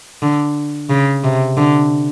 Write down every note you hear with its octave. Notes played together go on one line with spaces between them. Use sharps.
D3
C#3
C3
D3